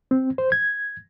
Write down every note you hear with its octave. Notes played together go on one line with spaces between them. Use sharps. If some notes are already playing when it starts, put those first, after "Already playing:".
C4
C5
G#6